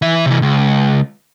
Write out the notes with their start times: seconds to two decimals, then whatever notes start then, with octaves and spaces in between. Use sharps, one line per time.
0.02 E3 E5
0.26 C3 E3
0.42 C#2